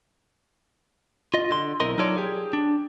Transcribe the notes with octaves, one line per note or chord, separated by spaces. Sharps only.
F4 D#5
D3 C6
B1 C4 E4 A#4 D#5 C6
F#3 D#4 F4 A4 C#5 D5
G4 G#4
D4